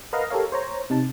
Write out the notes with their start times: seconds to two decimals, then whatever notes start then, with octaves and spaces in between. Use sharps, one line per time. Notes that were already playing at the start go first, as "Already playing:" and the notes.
0.13 A#4 B4 D#5 F5 F#5 A#5
0.30 G4 A4 A#4 C#5 F5
0.52 C5 C#5 A#5
0.90 C3 D#4 A5